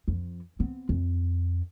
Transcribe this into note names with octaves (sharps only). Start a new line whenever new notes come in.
F2
B3 C4
F2